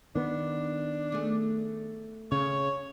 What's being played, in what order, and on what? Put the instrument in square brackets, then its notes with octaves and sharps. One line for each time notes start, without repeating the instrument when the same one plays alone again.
[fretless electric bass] D#3 B3 [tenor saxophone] D4
[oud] A3 G#4
[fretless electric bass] C#3 [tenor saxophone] C#5